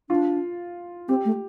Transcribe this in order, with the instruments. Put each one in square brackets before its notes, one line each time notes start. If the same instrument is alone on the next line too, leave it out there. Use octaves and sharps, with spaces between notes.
[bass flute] D4 [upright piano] F4
[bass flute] C4 [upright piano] G4
[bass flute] A3